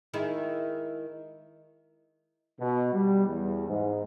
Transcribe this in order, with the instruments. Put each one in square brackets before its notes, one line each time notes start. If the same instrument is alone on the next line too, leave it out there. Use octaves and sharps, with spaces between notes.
[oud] D#3 G#3 E4
[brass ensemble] B2
G3
E2
G#2